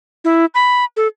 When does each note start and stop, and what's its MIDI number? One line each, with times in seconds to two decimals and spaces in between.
0.25 0.46 64
0.55 0.84 83
0.97 1.07 69